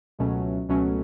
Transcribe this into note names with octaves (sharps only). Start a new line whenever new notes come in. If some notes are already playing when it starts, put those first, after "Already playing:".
C#2 B2 F#3 A3 C#4
C#2 B2 F#3 A3 C#4